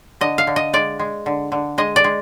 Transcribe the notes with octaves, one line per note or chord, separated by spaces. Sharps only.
D3 D#5
F5
D3
D#5
G#3 D5
G#3
D3
D3
G#3 D#5
D5
G#3